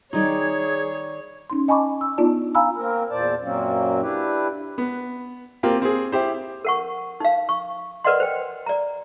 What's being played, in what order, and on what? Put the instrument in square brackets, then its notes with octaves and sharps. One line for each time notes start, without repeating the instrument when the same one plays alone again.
[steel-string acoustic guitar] D#3 G3 D5 [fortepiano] D#4 [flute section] G#4 G#6 [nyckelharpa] C#5
[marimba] C#4 D#4 C6
D#5 G#5 A5 B5 C#6 D6
E6
B3 D4 D#4 F4 D5 A5
F5 G#5 A#5 B5 E6 F6
[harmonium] A#3 C4 A#4
E2 A#2 C5 D5 A5
F#2 A#2 F#3 A#3 C4 C#4
D4 E4 G4 B4
[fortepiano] B3
A#3 C4 F4 G4
C4 G#4
E4 G4 C5
[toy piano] A#4 F#5 C#6
D#4 F5
C#6
A#4 B4 D5 D#5 F#5 C6
C5 G5
D5 A#5